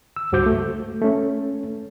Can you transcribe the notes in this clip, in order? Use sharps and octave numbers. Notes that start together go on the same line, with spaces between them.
E6
C#2 G2 F#4 C5 D6 G6
A3
A3 C#4